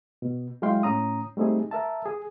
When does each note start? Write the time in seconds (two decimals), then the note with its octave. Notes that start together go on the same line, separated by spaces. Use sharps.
0.22 B2
0.62 F#3 G#3 E4 F5 G5 C6
0.83 A2 C#4 A#5 D#6
1.37 G3 A3 C4 D#4 G#4
1.71 A#4 E5 A5
2.06 G#4